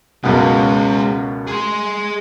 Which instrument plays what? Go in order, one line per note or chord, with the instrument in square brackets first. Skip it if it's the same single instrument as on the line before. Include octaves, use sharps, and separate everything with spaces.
[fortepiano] C#2 F#2 B2 [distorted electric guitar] G#3 C#4
[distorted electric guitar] G#4 C6